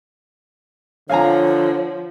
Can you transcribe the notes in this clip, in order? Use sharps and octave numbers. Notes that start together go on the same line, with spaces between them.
D3 F3 C#5 F5 G#5 A#5